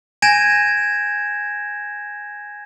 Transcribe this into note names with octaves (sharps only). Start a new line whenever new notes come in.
G#5 G6 G#6 A#6 D7 E7